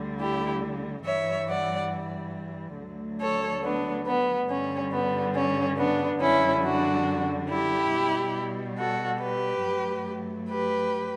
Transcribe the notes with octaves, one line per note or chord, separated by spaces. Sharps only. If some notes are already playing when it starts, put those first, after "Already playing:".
Already playing: D2 D3 G3
E4 G4
G2 E3 G3 C#5 E5
D5 F#5
D2 D3 F#3 A3
A4 C#5
B3 D4
B3
G2 D3 G3 C#4
B3
C#4
B3 D4
F#2 D3 G3 C#4 E4
D4 F#4
E4 G4
B2 G3
F#4 A4
G4 B4
G2 F#3 A3
G4 B4